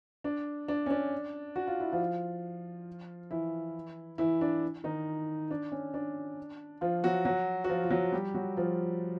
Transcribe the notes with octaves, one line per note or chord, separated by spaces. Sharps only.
D4
D4
C#4
D4
F#4
F4
E4
F3 F4
E3 E4
E3 E4
D4
D#3 D#4
D4
C#4
D4
F3 F4
F#3 F#4
F#3 F#4
F#4
F3 F4
F4
F#3 F#4
G3 G4
F#3 F#4
F3 F4